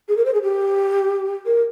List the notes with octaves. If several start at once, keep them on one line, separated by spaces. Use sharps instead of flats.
G#4
A#4
C5
G#4
G4
A#4